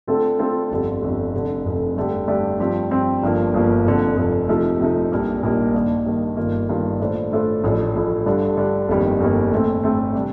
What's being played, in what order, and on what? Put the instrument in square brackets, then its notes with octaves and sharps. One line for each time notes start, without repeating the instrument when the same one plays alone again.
[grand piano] D3 A3 C4 F4 A4
D3 A3 C4 F4 A4
G1 F2 D3 G3
G1 F2 D3 G3
F1 F2 D3
F1 F2 D3
G2 D3 A3 D4 G4
G2 D3 A3 D4 G4
G2 F3 C4 G4
G2 F3 C4 G4
G1 G2 F3 A#3
G1 G2 F3 A#3
F1 F2 D3 F3
F1 F2 D3 F3
C3 F3 A3 D#4
C3 F3 A3 D#4
A#1 A#2 G3 A#3 D#4
A#1 A#2 G3 A#3 D#4
G2 D#3 A#3 D4
G2 D#3 A#3 D4
G1 G2 D#3 A#3 F4
G1 G2 D#3 A#3 F4
A2 A3 D4 F4 C5
A2 A3 D4 F4 C5
A1 A2 F3 A3 D4
A1 A2 F3 A3 D4
G2 D3 G3 D4 A4
G2 D3 G3 D4 A4
G1 F2 D#3 G3 A#3
G1 F2 D#3 G3 A#3
A2 A3 C4
A2 A3 C4
C3 G3 D4